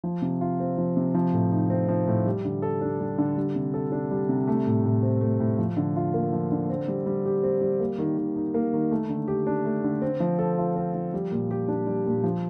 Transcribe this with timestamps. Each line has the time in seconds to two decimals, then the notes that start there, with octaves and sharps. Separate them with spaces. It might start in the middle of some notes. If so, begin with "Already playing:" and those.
0.04 F3
0.22 C3
0.41 F4
0.60 C4
0.78 F3
0.97 C3
1.14 F3
1.33 A2
1.51 D#4
1.70 C4
1.88 F3
2.07 A2
2.26 G3
2.45 D3
2.62 A4
2.81 D4
3.00 G3
3.18 D3
3.37 G3
3.55 C3
3.74 A4
3.92 D4
4.11 G3
4.29 C3
4.48 A3
4.67 A2
4.84 A2
5.03 C4
5.21 A3
5.40 A2
5.58 F3
5.77 D3
5.96 F4
6.14 A#3
6.33 F3
6.52 D3
6.69 C4
6.88 G3
7.06 G3
7.26 G4
7.43 C4
7.61 G3
7.80 A#3
7.98 D#3
8.18 D#3
8.36 D#4
8.54 A#3
8.73 D#3
8.91 A3
9.10 D3
9.28 G4
9.47 D4
9.65 A3
9.84 D3
10.02 C4
10.20 F3
10.39 A4
10.58 F4
10.76 C4
10.94 F3
11.14 G3
11.31 A#2
11.51 G4
11.68 D4
11.87 G3
12.06 A#2
12.24 F3